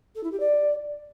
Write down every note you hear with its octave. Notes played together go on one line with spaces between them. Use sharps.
A4
E4
G4
D5